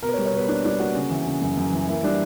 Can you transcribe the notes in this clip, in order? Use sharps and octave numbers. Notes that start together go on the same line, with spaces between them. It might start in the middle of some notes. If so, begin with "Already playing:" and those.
B2 A#4
B4
C#5
G3
C#5
B2 B4
A#3 D4
G3 D4
A#3 F#4
C#3
E3
C#3
F#2
F#2
E3
A#3 E4
G3 D4